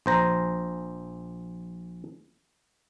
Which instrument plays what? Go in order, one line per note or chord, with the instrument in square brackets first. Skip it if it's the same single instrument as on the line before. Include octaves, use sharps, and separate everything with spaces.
[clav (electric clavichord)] A#1 C5 A#5